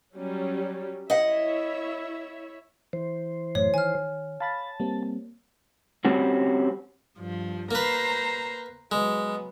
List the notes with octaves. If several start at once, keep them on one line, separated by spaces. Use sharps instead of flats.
F#3 G3 C#4
E4 C#5 D#5 E5 F#5
E3 C5
F#2 A2 C#5
D#3 G#5 F6
F5 A5 B5 A6
G3 A#3 C4
G3 C4 C#4 F#4
G2 F3
A#3 B4 C5 A#5
F#3 G#3 B3